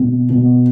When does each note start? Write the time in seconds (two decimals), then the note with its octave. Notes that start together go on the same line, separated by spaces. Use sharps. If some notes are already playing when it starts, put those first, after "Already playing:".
Already playing: B2
0.29 B2